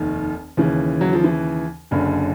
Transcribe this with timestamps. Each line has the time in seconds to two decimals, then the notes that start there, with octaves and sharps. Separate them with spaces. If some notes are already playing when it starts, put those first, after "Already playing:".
Already playing: F1 D#2 D#3
0.57 D#2 C#3 E3
1.01 F#3
1.13 F3
1.24 E3
1.91 F#1 F#2 D3